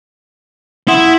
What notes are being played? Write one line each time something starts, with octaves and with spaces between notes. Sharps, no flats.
E4 F#5 C6 D#6